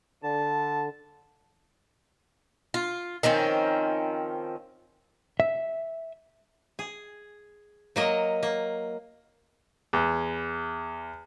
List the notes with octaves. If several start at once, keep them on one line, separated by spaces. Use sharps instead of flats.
D3 A5
F4
D#3 F3 C4 C#4
E5
G#4
F#3 A#3 D#5
A#3
E2